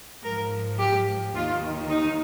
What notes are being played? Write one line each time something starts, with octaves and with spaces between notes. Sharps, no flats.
G#2 F3 A#4
G4
D#2 D#3 F4
D#4